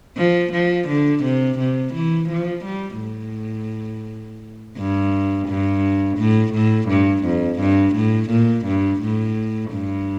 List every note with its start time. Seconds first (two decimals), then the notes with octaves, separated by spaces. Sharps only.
0.17 F3
0.53 F3
0.88 D3
1.24 C3
1.59 C3
1.94 E3
2.29 F3
2.65 G3
3.00 A2
4.77 G2
5.48 G2
6.18 A2
6.53 A2
6.89 G2
7.24 F2
7.60 G2
7.95 A2
8.30 A#2
8.66 G2
9.01 A2
9.72 G2